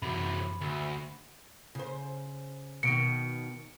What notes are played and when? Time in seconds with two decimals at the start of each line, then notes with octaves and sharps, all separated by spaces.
0.02 F#2 C3 E3 F#3 B5
0.61 D2 E5 E6
1.75 C#3 C5
2.83 B2 D#3 C#7 D7